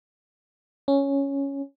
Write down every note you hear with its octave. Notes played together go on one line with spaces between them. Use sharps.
C#4